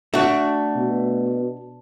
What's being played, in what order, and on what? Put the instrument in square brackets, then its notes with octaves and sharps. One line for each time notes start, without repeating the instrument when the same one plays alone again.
[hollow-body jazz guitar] A3 F#4 [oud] D4
[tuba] B2